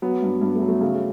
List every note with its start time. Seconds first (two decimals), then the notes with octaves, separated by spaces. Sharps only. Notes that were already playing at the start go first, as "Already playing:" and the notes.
0.02 F#3 B3
0.22 G2
0.41 G2
0.55 A3
0.61 F#3
0.68 A3
0.81 C#3